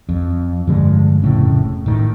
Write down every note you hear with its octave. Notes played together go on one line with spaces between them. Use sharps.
F2
G2 D3 F3 G#3
F1 A2 C#3
A2 D#3